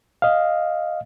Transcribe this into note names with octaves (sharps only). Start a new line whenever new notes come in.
D#5 F5